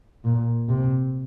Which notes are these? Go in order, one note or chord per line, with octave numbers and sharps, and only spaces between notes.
A#2
C3